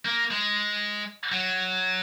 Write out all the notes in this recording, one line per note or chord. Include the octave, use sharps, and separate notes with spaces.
A#3
G#3
F#3